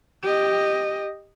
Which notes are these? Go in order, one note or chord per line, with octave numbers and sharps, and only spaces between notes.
G4 D#5